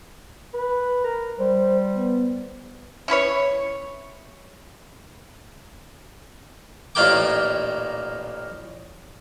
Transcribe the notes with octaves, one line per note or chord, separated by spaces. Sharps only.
B4
A#4
G3 C5
B3
C#4 E4 B4 C#5
A1 A#2 D#3 A#3 G5 D6